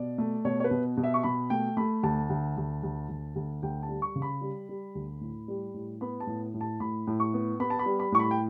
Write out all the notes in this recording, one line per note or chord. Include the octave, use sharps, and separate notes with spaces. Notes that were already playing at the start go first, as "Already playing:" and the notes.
Already playing: B2 D5
A3
B2 C#5
C#5
B4
B2
B2
E5
C#6
B2 B5
A3 G5
A3 B5
D2 A5
D2
D2
D2
D2
D2
D2 G5
A5
G3
C#6
C#3
B5
G3
G3
D2
A2
G3
A2
B3 B5
A5
A2
A2
A5
A2 B5
A2
C#6
B3
B3 B5
A5
B5
G3
B5
A2 C#6
B5
G5